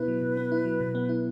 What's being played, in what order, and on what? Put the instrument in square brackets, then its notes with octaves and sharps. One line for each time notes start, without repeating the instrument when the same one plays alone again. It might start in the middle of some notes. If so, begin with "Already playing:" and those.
Already playing: [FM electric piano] B2 B3 E4 [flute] B4
[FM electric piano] F#3
B2
B3
E4
F#3
B2
B3
E4